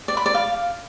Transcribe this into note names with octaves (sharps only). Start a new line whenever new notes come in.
D5
B5
D5
F5